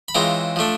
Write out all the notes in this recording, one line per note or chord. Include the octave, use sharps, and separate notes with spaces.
B5
C#3 E3 G#3 C4 F4 A#5
F3 A3 D4